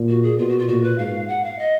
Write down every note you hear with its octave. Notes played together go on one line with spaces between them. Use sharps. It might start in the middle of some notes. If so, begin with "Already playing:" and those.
Already playing: A#2
F#4
G#4
B2 F4
F#4
F4
A#2 F#4
B4
G#2 F5
F#5
F5
D#5